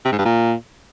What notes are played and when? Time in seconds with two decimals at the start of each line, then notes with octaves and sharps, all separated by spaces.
0.05 C3
0.12 G#2
0.19 G2
0.25 A#2